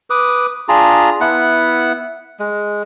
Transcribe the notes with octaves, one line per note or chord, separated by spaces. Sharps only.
B4 D6 D#6
D4 F4 G#4 A#5
B3 E4 F#5
G#3